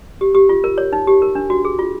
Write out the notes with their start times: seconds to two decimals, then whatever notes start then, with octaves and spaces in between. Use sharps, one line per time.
0.21 G4
0.35 G4
0.49 F4
0.64 A#4
0.78 C#5
0.93 D#4
1.07 G4
1.22 A#4
1.35 D4
1.50 F#4
1.65 G#4
1.79 F4